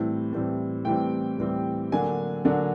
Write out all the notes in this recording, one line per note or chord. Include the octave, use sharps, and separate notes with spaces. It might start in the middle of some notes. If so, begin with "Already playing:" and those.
Already playing: A2 E3 G3 C4
A2 E3 G3 C4
A2 E3 G3 C4 G5
A2 E3 G3 C4
D3 F#3 A#3 D4 G#5
D3 F#3 A#3 D4